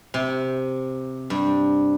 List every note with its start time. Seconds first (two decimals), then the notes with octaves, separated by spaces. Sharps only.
0.14 C3
1.30 G2